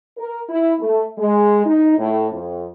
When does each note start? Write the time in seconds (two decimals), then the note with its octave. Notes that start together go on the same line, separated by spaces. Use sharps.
0.18 A#4
0.49 E4
0.80 A3
1.17 G#3
1.66 D#4
1.98 A2
2.31 F2